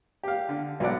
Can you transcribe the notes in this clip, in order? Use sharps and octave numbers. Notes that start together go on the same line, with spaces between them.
G4 F5
D3
B1 F#3 D5 F#5